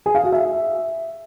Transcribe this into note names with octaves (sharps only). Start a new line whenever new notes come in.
G#4
F5
F#4
E5